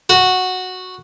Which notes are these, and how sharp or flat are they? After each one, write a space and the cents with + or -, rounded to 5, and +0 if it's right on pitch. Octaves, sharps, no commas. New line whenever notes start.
F#4 -5